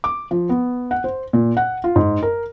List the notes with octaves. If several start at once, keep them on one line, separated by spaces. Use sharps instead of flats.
D6
F3
B3
F#5
C5
A#2
F#5
F4
G#2
A#4